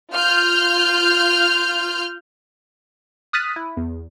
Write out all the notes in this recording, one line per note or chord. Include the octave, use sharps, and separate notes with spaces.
F4 F6 G6
D#6 F6 F#6 A6 B6 D#7
E4
E2